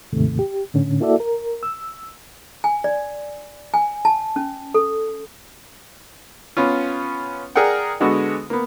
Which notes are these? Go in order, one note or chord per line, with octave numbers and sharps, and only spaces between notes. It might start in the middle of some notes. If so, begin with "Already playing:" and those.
D#2 G#2 C3 D#3 A3
G4
A2 D3 C#4
A#3 E4 F#4 A4 D5 E5
A#4
E6
G#5
D5
G#5
A5
C#4
A4
B3 C#4 F4
G#4 A#4 D5 F#5 G5
D3 G#3 B3 F#4 A4
A#3 B3